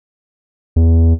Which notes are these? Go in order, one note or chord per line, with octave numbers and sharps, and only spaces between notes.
E2